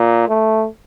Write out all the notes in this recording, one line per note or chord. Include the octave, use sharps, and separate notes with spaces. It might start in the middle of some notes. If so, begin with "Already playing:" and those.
Already playing: A#2
A3